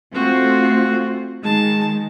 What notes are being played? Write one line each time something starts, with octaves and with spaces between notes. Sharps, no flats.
A3 C4 F4 F#4
D#3 G#3 A5